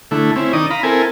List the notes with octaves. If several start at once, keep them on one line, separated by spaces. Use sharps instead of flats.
D3 A3 E4
C4 C#4 E4
D#3 D#4 D5 D#6
F5 A#5 B5
C4 E4 A4 A#4 G#5